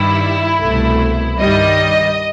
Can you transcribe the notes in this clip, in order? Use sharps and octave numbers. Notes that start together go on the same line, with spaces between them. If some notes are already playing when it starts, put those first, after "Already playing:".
Already playing: G2 D#3 G3 E4
C2 B2 A3
G2 D#3 G3 D#5